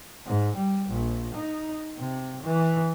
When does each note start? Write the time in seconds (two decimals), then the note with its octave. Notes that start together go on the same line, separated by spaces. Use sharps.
0.25 G#2
0.56 G3
0.89 A#1
1.35 D#4
1.97 C3
2.43 E3